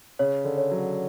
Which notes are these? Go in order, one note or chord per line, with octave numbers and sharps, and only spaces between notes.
C#3 C#5
D3
C#5
F#3